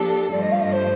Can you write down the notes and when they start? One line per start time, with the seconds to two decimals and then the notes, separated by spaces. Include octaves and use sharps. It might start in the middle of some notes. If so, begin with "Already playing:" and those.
Already playing: F3 A#3 D4 G4 A4
0.32 G2 F3 A3 D5
0.42 D#5
0.52 F5
0.62 D#5
0.73 C5